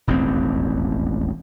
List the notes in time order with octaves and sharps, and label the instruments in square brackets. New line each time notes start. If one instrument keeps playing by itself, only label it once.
[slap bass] E1 A1 D#2 C4